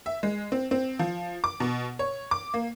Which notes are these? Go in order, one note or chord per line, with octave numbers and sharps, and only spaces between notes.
E5
G#3
C4
C4
F3
D6
B2
C#5
D6
A#3